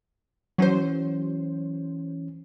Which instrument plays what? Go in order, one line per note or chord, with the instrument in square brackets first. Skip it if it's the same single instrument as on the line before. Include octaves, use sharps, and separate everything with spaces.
[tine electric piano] E3 C#4 [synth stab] F#3 C5